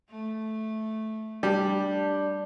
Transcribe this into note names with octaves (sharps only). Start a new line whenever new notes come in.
A3
G3 D4